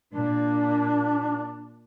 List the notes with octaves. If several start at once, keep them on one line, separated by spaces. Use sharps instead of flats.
A#2 D4